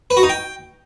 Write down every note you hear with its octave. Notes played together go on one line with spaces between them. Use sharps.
B4
F#4
D#4
G5